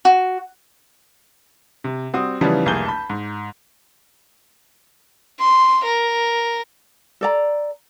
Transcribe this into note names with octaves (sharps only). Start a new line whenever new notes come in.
F#4
C3
G3 C4 F#4 D#6
C#3 E3 F3 G3 B3 D#4
F1 C2 A#3 G#4 G6 G7
A5 B5
G#2
C6
A#4
A4 D5 A#5